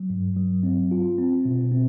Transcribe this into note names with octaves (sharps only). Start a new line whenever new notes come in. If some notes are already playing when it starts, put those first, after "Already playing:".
Already playing: F#3
G2
F#3
C4
F4
C4
B2
C4